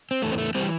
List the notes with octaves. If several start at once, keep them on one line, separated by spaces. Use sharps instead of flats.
C4
E2 E3 A3
C4
A3
E3 G3 C4